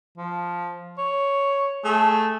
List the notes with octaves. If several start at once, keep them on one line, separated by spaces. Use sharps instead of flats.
F3
C#5
A3 G#4